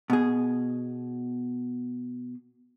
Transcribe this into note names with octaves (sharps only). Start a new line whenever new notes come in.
B2 G#4